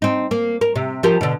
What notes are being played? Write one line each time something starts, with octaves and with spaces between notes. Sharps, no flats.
C4 D#4
A#3
A#4
C3
F3 G4 A#4
B2 D3